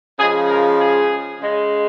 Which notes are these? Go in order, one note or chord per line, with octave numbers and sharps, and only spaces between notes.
C#3 F3 G#3 G#4
A#4
G#4
C#3 G#3